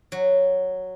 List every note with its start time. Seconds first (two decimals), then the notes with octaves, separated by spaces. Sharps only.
0.12 F#3